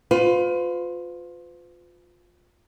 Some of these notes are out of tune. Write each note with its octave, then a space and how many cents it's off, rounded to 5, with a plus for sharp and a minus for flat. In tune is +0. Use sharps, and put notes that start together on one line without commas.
F4 +20 B4 +45